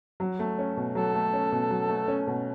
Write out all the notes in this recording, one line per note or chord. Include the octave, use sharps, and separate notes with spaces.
F#3
A3
C#4
B2
F#3 A4
A3
C#4
B2
F#3
A3
C#4
B2